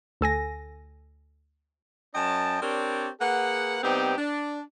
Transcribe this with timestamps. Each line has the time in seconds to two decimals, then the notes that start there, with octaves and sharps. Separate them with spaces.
0.21 D2 A4 G#5 A#6
2.15 F#2 C#4 D#5 G5 A5
2.62 C4 D4 G4 A#4 C#5 D5
3.21 A#3 G#4 B4 F#5
3.83 C3 G3 B3 C4 D#4 G4
4.18 D4